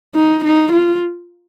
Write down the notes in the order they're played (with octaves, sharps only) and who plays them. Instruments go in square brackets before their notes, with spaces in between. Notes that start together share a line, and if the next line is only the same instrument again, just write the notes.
[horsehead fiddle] D#4
D#4
F4